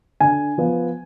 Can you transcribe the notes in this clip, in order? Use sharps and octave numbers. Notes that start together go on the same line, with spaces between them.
D3 G#5
F3 B3